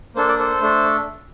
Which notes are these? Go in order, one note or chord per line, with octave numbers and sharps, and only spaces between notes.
A#3 D4 A4 C5
D5
A4 C5
A3 D4 A4